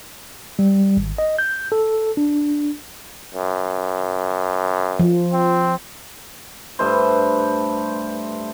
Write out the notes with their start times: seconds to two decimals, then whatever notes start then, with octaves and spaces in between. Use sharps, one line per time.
0.59 G3
0.97 G#1
1.18 D#5
1.38 G6
1.72 A4
2.17 D4
3.34 F#2
4.99 F3
5.33 C4
6.79 G2 A3 B4 C5